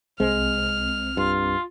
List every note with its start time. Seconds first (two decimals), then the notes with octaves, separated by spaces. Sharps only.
0.20 C2 G#3 C4 F6
1.17 G2 F4